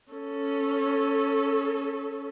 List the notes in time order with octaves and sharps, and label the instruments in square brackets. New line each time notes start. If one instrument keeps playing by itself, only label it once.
[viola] C#4 A4